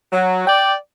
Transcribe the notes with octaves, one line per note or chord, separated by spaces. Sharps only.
F#3
D5 G5